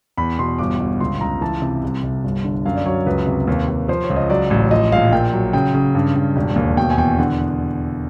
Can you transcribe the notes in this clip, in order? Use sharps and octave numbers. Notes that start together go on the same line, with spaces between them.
E2 B5
B2 C6
G1 D6
G1
C#2 C6
C#2 A#5
E3 A5
C3
C2
C2
G1
D3
F#2 F5
D5
F#3 C#5
C#2 B4
C3
D#2
D#2
F3 C5
C#5
C#2
D#5
F#3 D5
A1
F3 D#5
A#1 F5
A#2 G5
F#3
C#3 G5
C#3
G2
G2
E1
D#2
B2 G5
G#5
E2 G5
D3 F#5